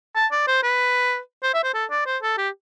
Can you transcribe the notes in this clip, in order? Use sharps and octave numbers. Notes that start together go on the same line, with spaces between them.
A5
D5
C5
B4
C5
E5
C5
A4
D5
C5
A4
G4